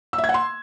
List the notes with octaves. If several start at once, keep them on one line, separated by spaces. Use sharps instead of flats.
E6
E5
G#6
F#5
C6